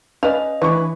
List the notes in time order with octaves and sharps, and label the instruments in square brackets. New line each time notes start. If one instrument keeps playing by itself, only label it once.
[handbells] C#4 D#5 [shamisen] B4 D5 F5 [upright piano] F7
[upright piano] E3 C#6 [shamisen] D4 E4 [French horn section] B4